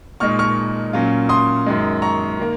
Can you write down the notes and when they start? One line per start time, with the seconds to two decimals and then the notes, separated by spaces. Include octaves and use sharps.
0.20 A#2 G#3 D#4 C#6 F6
0.39 C#6 F6
0.93 A#2 F#3 C#4 F4
1.29 C6 D#6
1.66 F#2 D#3 G#3
2.02 A#5 C#6
2.40 D#3 A#3